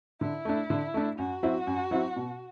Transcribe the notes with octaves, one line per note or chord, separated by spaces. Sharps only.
D3 E4
A3 D4
D3
A3 D4
F#2 F#4
F#3 C4 E4
F#2
F#3 C4 E4
B2